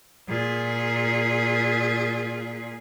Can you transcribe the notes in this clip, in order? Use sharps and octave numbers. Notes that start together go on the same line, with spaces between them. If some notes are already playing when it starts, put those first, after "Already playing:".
A#2 G#4